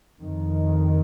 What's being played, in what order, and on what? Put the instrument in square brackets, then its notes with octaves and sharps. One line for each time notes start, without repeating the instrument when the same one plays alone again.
[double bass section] F2 D#3